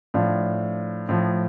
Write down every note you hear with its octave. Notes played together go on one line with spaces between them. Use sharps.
A2 F3 D4 F4
A2 F3